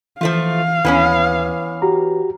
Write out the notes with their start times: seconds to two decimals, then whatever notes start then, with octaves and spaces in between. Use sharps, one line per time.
0.21 E3 F3 A3 F4 F5
0.85 D#2 E3 B3 C#4
1.82 F#4 G4 A#5